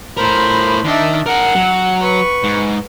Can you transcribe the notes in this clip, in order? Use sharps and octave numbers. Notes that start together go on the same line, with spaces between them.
A2 A#4 C5 B5
D#3 D4 D#5 E5
G#4 A#4 F#5
F#3
B4 C#6
G#2